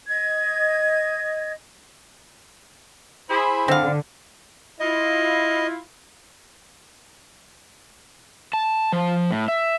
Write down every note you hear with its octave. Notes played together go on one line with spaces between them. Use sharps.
D#5 G#6
E4 G#4 C5
D3 C4 F5
E4 F4 D#5
A5
F3
A2
E5